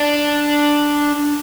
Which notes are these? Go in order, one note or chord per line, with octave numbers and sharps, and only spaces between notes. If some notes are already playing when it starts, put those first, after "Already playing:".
Already playing: D4